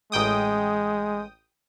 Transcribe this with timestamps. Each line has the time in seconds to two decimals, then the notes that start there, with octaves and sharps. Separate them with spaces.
0.12 A1 G#3 G5 D#6